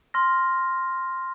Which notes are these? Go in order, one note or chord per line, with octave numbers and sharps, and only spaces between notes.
C6 F6 A#6